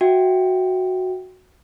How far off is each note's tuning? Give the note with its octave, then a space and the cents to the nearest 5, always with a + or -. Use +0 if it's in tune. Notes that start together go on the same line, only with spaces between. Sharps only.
F#4 +0 E5 +0 G5 +0